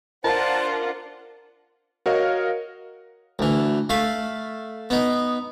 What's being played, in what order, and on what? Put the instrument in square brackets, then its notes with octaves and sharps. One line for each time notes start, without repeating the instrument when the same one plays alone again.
[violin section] D4 F4 F#5 [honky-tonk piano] A#4 [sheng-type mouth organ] C5 [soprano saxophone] A5
[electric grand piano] F#4 A#4 C#5 D#5 F5
[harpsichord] D2 E3
A3 F5 B5
B3 D#4